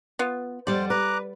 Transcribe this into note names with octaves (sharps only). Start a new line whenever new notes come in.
B3 F4
F2 G3 C5 D5 F#5
B4 A#5 D6 F#6